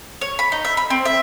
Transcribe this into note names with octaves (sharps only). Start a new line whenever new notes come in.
C#5
B5
D#4
E5
B5
C4
E5